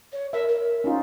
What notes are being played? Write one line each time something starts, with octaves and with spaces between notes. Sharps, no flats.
C#5
A#4 E5
A#4
C#4 D#4 F4